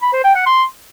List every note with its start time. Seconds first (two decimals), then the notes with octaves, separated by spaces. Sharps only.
0.02 B5
0.13 C5
0.24 G5
0.35 F#5
0.46 C6